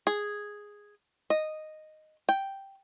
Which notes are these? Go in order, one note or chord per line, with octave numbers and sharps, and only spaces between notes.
G#4
D#5
G5